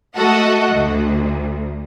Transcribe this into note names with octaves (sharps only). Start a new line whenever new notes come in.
A3 F#4 A4 D#5 F#5
D2